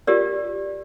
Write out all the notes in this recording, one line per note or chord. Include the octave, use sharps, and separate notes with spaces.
F4 G4 A#4 D5